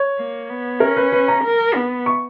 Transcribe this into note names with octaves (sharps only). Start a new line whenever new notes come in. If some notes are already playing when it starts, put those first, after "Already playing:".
Already playing: C#5
A#3
B3
C#4 A#4
B4
B4
A#5
A#4
B3
C#6